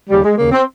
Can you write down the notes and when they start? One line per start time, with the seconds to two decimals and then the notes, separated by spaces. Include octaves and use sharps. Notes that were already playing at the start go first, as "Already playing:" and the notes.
0.09 D#2 C#3 G3
0.23 G#3
0.38 D#2 C#3 A#3
0.52 C4